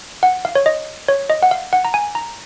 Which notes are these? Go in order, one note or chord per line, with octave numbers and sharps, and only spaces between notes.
F#5
F5
C#5
D#5
C#5
D#5
F#5
F5
F#5
A#5
G#5
A#5